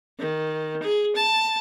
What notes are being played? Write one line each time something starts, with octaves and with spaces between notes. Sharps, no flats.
D#3
G#4
A5